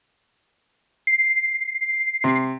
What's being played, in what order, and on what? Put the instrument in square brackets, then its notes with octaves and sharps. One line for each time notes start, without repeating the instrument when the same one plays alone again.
[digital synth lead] C7
[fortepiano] C3